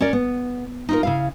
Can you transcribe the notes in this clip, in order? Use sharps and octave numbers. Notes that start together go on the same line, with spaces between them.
C#4 A#4 D5
B3
D#4 F4 A#4
C#3 E4 F5